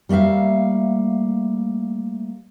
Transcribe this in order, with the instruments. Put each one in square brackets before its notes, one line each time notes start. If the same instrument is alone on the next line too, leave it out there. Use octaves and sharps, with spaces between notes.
[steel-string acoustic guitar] G3 A3 A#3 E5 F5